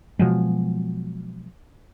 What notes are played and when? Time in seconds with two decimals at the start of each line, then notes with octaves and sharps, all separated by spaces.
0.19 B2 F3 F#3 G#3